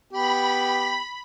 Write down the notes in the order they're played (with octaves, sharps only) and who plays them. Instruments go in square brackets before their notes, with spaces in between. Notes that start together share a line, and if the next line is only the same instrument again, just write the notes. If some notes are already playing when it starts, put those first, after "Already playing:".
[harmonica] B3 G4 G5 [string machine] B5